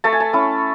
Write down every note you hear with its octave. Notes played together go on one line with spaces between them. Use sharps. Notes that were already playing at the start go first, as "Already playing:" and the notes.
A3 A5
G#5
A5
C#4 E4